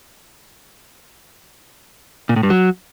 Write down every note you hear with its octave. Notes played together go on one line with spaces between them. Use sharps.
A#2
A2
G2
F#3